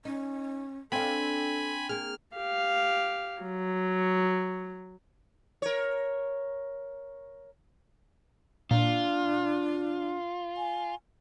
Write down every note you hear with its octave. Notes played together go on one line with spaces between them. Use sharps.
C#4 D#4
C4 D4 A4 F5 G#5 B5
A#3 G#4 F6
G4 F5
F#3
A#4 C#5
A#2 D4 F4
G#5